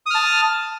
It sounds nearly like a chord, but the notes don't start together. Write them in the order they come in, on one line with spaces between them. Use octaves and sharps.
D#6 F6 A5